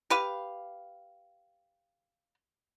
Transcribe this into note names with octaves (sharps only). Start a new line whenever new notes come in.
G4 B4 F5